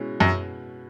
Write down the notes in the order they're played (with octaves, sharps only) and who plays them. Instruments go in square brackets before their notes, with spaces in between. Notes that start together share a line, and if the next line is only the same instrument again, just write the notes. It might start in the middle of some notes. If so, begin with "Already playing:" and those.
Already playing: [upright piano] B2 G#3 C#4 E4
[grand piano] F#2
[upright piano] B2